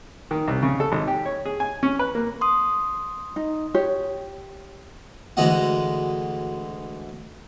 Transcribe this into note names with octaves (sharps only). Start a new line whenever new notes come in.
D#3
C2
C#3
A4
G#1
G4
C#5
G#4
G#5
C#4
B4
A#3
C6 D#6
D#4
G4 C#5
D2 E3 G#3 F#4 D#5 F#5